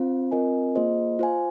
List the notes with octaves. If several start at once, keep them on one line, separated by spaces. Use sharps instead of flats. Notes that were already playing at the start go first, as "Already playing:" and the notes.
Already playing: C4 F4 C5 F5
C4 F4 A#4 D#5 G#5
A#3 F4 G#4 C5 D#5
F4 C5 F5 G#5